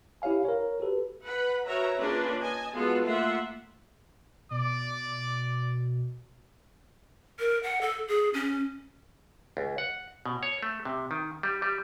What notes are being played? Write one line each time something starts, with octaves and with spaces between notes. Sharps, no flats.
E4 G4 C#5 F5 G#5
A#4 C#5
F#4 G4 A4 B4
B4 F#5 B5
F#4 A#4 B4 C#5 E5 A#5
A#3 C#4 D4 F4 G#4 B4
D#5 G#5 A5
G#3 B3 F4 F#4 A4
A3 A#3 F4 E5 F#5 C6
B2 D5 D6
A#4
F#5
A4
G#4
C#4
C#2
F#5
B2
C#5
A3
C3
D#3
G3
G3